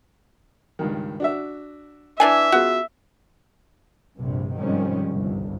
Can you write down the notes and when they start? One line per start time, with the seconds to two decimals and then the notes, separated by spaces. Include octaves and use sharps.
0.79 C#2 G2 D#3
1.20 D4 F#4 E5
2.20 E3 D4 E5 G#5
2.52 B3 F4 F#4 G#4
4.19 A#1 G2 C3
4.57 G#2 C3 D#3 F3 G3 C#4
5.09 G1 C2